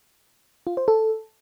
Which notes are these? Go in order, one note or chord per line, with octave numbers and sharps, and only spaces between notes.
F4
C5
A4